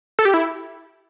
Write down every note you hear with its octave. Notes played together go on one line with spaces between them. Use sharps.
A4
G4
E4